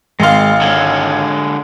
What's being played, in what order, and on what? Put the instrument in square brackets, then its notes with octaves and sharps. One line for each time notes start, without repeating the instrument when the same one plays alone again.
[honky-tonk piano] G#1 F5 [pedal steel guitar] G#3 C6
[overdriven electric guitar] D3 G#3 [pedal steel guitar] C#5